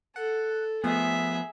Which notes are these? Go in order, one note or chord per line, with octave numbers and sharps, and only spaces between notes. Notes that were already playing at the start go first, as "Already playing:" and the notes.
A4 F#5
F3 A3 B3 G#4 E5